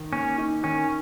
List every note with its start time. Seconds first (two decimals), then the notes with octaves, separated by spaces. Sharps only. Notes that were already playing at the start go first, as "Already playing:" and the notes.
Already playing: D#3
0.12 A#3 C#4
0.38 D#4
0.63 D#3 C#4